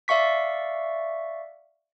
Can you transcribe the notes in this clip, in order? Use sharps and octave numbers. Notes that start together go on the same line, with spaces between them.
D5 E5 F5 C#6 B6